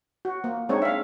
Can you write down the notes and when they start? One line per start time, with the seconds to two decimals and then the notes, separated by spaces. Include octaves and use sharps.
0.25 F#4
0.44 A#3
0.69 G#3 C4 D4 D#4 C#5
0.82 E5 F5